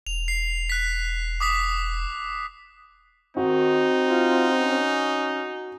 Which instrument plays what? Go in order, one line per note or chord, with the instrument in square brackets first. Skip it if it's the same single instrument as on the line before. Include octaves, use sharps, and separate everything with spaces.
[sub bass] E1 [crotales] F7
[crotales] C7
F#6 B6
D6 D#6 B6
[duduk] D#3 [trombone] C4 [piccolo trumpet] D#4 [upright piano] F#4
[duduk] F4
C#4